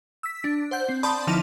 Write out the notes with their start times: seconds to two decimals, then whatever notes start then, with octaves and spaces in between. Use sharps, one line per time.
0.23 E6 B6
0.44 D4
0.71 C5 F#5 G6
0.89 C4
1.03 D5 A5 B5 C6 D#6 G6
1.27 D3 F3 D#4 E4 A5 F7